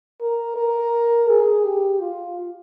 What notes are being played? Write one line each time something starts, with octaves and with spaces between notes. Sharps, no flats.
A#4
A#4
G#4
G4
F4